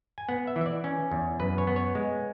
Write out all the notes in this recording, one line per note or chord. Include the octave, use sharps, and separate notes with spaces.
G#5
B3 F#5
E5
E3
E5
D5
C#4
E2
F#2 B4
C#5
B3
C#5
G#3